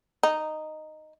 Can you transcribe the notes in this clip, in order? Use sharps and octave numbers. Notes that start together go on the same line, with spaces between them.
D#4